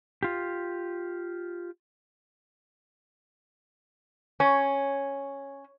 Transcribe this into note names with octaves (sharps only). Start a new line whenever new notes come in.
F4 G4
C#4